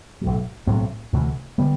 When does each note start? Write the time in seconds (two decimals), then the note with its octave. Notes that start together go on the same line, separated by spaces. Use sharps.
0.21 B1 A2 F#3
0.66 B1 A2 F#3 C4
1.12 D2 C3 E3 A3
1.58 D3 G3 B3